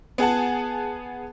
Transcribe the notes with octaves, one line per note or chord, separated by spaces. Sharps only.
B3 G#4 F#5 A5